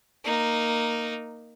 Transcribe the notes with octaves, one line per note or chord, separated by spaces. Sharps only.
A#3 D#4